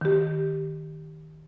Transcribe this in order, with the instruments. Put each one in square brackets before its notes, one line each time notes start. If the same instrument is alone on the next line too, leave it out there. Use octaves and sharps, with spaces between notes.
[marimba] D#3 G4